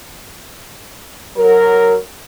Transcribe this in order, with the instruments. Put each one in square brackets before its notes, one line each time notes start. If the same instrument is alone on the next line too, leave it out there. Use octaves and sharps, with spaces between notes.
[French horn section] F#3 A#4